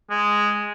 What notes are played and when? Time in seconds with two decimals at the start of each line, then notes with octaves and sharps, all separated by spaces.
0.11 G#3